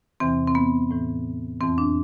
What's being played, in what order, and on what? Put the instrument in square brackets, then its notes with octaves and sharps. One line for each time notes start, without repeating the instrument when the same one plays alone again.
[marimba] E2 C3 E3 C4
C4
B3
A2 E3
F2 E3 C4
D4